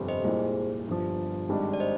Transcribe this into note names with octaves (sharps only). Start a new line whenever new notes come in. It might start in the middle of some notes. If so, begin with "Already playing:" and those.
Already playing: G1 F2 C3 G3
C5 D#5
C2 A#2 G#3 G#4 C5
G1 G2 F3
G#1 G#2 G3 D4
D5
C5 D#5